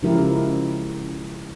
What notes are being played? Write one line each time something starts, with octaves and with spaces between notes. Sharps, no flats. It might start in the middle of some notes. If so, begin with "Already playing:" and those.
C#3 F3 G#3 E4 G4 A#4